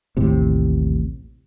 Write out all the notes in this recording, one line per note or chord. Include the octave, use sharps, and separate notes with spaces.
A1 D#2 A2 C3